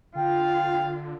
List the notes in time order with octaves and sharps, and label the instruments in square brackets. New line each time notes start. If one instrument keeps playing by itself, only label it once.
[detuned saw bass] D3 [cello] F4 [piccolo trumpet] F5 [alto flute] G5